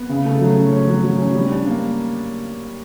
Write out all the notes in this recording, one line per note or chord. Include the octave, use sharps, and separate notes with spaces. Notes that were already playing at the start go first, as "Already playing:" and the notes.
Already playing: B3
C#3
A3
F#3
C#4
C#4
F#3
F#3
C#4
G3
D4
A#3